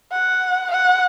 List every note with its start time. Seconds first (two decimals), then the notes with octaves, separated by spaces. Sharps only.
0.12 F#5
0.71 F#5